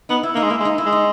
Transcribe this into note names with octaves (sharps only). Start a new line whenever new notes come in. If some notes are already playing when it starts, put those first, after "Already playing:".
B3 D#4
E4
A#3 D#4
G#3
A#3 E4
G#3
D#4
E4
G#3
D#4